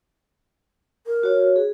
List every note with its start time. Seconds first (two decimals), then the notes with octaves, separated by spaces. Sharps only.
1.06 A#4
1.23 F#4 C#5
1.56 G#4